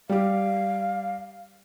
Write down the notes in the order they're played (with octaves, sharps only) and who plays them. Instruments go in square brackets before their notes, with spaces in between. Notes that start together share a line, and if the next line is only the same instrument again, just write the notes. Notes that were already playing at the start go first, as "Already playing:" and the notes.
[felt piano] G3 G4 [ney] F5